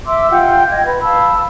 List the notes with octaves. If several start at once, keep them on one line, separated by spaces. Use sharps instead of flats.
E5 C6 D6 E6
F4 G4 F#5 G5
D#5 G5 G#6
B4 B5
F5 A5 B5 E6